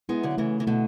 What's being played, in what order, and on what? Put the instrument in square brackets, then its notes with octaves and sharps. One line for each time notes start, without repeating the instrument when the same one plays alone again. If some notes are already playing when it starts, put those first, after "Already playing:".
[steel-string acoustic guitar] G#3 B3 [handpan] E4
[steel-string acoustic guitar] D3 F#3
[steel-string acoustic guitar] C#3 E3 [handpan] A3
[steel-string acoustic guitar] E3
[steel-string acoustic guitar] B2 D3 [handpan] A3